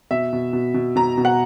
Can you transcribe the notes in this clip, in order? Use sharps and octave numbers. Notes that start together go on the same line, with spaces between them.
B2 E5
B2
B2
B2
B2 A#5
B2
F#5